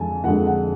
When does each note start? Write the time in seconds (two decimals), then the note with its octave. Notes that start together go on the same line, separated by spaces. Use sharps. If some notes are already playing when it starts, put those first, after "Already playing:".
Already playing: F2 D3 G#3 G#5 A5
0.24 F2 D3 G#3 F#5
0.47 F#5